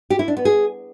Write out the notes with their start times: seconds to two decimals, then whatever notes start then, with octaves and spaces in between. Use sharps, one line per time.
0.10 G4
0.19 E4
0.28 D4
0.37 B3
0.45 G#4